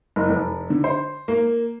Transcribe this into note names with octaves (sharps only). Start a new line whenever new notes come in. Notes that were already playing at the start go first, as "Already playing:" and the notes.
F#1
F1
D3
C5
A#3